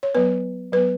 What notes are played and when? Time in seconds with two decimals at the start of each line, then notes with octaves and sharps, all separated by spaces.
0.03 C#5
0.15 F#3 B3 B4
0.73 F#3 B3 B4